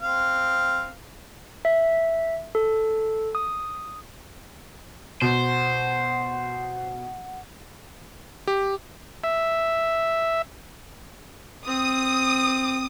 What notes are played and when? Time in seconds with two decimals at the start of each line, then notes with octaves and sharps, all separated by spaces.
0.01 C4 F5
1.65 E5
2.55 A4
3.35 D#6
5.22 B2 C5 F#5
8.47 G4
9.24 E5
11.67 C4 D#6